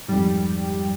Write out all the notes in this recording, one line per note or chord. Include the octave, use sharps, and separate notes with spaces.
F2 G#2 G3